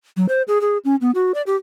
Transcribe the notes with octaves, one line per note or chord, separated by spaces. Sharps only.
F#3
C5
G#4
G#4
C#4
B3
F#4
D5
G4